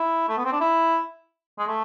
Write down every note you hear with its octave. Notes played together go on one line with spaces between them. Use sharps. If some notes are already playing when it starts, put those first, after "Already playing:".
Already playing: E4
A3
B3
C4
D4
E4
G#3
A3